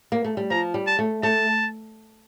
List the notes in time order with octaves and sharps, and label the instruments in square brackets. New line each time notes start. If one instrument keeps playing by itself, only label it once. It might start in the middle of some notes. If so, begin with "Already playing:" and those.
[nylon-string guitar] A#3
A3
G3
[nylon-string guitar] F3 [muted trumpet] A#5
[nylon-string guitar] G3
[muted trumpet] A5
[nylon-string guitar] A3
[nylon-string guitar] A3 [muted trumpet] A5